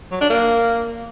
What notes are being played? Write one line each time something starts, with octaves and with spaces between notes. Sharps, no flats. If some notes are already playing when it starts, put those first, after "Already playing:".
F#3
D4
A#3